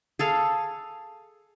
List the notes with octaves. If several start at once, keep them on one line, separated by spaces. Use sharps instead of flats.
G#4 A4 F5